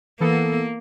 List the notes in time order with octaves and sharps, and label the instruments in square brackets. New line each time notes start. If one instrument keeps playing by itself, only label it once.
[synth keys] E3 B3 A4 [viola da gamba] A#3